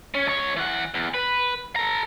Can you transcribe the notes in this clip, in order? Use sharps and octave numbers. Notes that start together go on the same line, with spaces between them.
C#4
C#2 C#5
E3 F#5
E2
B4
A4 A#5